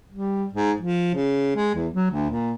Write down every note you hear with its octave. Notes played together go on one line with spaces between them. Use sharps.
G3
G#2
F3
C#3
G#3
E2
F#3
D2
A#2